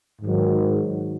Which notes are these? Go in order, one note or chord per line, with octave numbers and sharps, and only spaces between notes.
G#2 D#3 F#3